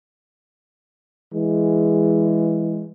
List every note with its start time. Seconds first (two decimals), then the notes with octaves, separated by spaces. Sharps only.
1.34 E3 G#3